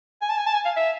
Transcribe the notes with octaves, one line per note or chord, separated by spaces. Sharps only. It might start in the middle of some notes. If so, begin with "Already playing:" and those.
G#5
A5
G#5
A5
G#5
F5
E5